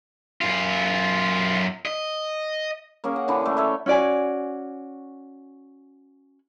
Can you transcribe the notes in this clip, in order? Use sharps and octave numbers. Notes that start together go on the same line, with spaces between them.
F#2 F4
D#5
A#3 C#4 G#4 A#4
F#5
D3 E3 C#4 D4
A3
A4 C#5 E5
C#4 F#4 D5 G#5